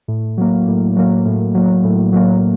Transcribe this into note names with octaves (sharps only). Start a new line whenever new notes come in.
A2
F#3 A#3
A2
F#3 A#3
A2
F#3 A#3
A2
F#3 A#3